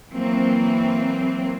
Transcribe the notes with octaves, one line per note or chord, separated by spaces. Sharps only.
E3 F#3 A#3 C4